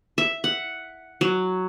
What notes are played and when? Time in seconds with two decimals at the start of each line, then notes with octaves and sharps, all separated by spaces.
0.18 E5
0.44 F#5
1.21 F#3